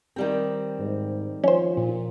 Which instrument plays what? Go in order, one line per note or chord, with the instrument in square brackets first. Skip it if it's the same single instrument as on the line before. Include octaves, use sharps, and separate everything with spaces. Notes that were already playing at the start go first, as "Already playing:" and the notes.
[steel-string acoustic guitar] D#3 G3 C4
[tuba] G#2
[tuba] F3 [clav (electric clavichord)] C#4 C5
[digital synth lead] A#2